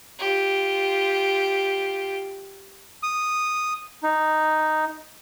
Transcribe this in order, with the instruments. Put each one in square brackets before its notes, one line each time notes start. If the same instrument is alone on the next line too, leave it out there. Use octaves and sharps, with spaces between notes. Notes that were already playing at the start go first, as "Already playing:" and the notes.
[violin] F4 G4
[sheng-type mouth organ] D#6
D#4